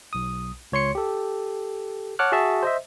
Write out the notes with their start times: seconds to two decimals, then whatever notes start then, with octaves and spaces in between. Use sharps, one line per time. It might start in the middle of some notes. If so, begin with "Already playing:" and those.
0.13 B1 D#6
0.72 C#2 C#5 C6 C#7
0.95 G4 A4
2.19 C#5 F#5 A5 D6 F6 F#6
2.32 F#4 G#4 E5 A5
2.63 C5 D#5 E5